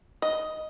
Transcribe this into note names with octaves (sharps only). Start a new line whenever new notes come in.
D#5